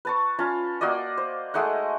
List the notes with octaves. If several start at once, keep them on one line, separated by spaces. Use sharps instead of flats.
B4 A5 C#6
C#4 F4 A5
A#3 F#4 D5 D#5
C5
G#3 A3 D#4 F#5